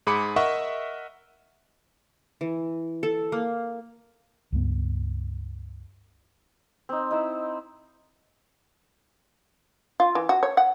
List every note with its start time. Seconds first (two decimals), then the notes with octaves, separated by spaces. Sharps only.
0.07 G#2 G#4 B5 D6 C#7
0.36 A#4 D#5 E5 F#5 C#6
2.41 E3
3.03 A4
3.32 A#3
4.52 C#2 G2 B3
6.89 C4 D#4
7.11 D#4 E4 C5
10.00 F4
10.15 E3
10.29 F#4
10.43 C#5
10.57 F#5